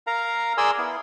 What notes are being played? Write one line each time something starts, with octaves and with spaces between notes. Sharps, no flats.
A#4 F5 A#5
G#4 A#4 D5 G#5 C6 E6
B3 E4